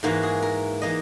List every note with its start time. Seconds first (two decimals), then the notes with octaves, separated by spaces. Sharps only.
0.03 G#2 E3 A#3 F#4
0.23 G#4
0.42 A#4
0.82 E3 A#3 D#5